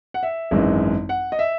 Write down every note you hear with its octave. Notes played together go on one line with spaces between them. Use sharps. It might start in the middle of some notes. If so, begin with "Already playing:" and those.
F#5
E5
G#1 F#2 E3 G#3
F#5
D#5
E5